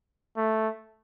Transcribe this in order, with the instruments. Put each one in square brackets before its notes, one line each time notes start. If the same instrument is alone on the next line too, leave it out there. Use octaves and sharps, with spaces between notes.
[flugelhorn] A3